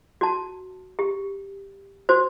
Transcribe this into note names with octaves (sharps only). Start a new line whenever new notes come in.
F#4 A5
G4
F#4 C5